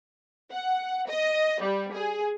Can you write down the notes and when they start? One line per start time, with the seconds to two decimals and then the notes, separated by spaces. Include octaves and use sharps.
0.51 F#5
1.08 D#5
1.62 G3
1.94 G#4